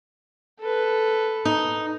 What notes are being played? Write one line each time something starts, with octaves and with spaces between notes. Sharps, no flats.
A4 B4
D#4